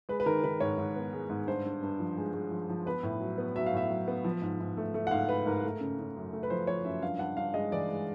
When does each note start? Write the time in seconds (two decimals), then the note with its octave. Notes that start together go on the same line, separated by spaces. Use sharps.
0.09 G#3 B4
0.20 B4
0.26 D#3 A#4
0.44 D#3 B4
0.60 G#2 C#5
0.78 G#2
0.96 B3
1.13 G#3
1.30 G#2
1.47 G2 C5
1.65 G2
1.82 G2
2.00 F3
2.17 G#3
2.34 G#3
2.51 F3
2.69 F3
2.86 B3 B4
3.03 A2
3.20 F#3
3.38 B3
3.55 F#3 E5
3.66 F5
3.74 A2 E5
3.90 F#3
4.08 B3
4.24 F3
4.42 G#2
4.60 G#2
4.77 A3
4.94 A3
5.07 F#5
5.11 G#2 F5
5.29 G#2 B4
5.46 G#2 A#4
5.64 A3
5.80 C#3
5.99 C#3
6.16 F#2
6.33 A3
6.43 B4
6.50 F3 C5
6.67 F3 C#5
6.85 F#2 E5
7.02 G2 F5
7.19 G2 F#5
7.37 G2 F5
7.54 G#3 D#5
7.72 E3 D5
7.89 G#3